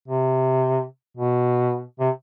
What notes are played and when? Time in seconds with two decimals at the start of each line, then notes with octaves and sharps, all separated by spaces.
0.08 C3
1.17 B2
2.00 C3